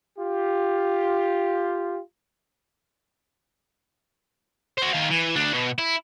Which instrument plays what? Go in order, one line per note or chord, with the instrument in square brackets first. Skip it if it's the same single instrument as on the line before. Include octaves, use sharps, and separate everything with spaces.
[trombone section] F4 G4
[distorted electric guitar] F#4 C5
D#3 F5
E3
D2 D4
B2
E4